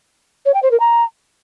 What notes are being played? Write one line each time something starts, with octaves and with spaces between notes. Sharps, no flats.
C#5
G5
C5
A#4
A#5